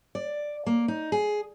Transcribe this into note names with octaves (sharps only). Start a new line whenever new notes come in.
D5
A#3
D#4
G#4